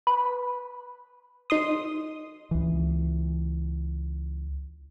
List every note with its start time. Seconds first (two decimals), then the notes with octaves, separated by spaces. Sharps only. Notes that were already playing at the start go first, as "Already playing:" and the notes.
0.07 B4
1.50 D#4 C6 D#6
2.51 C#2 E3